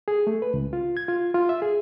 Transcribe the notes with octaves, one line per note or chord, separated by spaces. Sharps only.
G#4
A3
B4
C#2
F4
G#6
F4
F4
E5
G#4